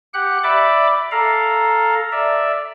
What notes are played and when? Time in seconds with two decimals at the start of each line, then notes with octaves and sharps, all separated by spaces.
0.14 G4 F#5 F#6
0.44 D5 E5 B5 D6
1.12 A4 F5 A#5
2.12 D5 E5